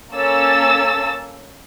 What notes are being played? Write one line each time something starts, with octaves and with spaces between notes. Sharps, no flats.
A#3 C#4 A4 E6 A6